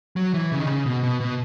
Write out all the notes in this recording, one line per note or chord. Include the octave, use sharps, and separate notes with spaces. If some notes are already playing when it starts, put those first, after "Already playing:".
F#3
E3
C#3
D#3
C#3
B2
B2
B2